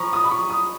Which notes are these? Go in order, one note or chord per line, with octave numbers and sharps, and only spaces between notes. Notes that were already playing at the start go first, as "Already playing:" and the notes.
Already playing: F3 A#5 B5 C#6
D#6
B5
C#6
D#6